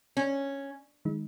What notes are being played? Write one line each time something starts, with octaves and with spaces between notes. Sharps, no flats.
C#4
D#3 G#3 D#4